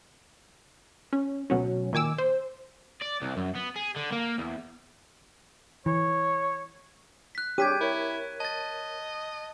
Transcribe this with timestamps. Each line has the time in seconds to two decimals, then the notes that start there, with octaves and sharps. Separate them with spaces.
1.13 C#4
1.50 D2 B2 F#3 C#4
1.93 A#2 D#3 G#5 D6 E6
2.18 C5
3.01 D5
3.22 C2
3.37 F#2
3.55 B3
3.76 G#4
3.96 D3
4.12 A#3
4.38 E2
5.86 E3 C#5
7.35 F#6 B6
7.58 D4 G4 G#4 C#5 G#6 B6 D#7
7.81 E4 A#4 C#5
8.40 D#5 A5 A6